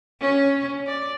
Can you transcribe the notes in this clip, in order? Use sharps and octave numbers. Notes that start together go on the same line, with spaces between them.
C#4
D5